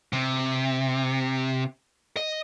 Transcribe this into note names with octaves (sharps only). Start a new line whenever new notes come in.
C3
D#5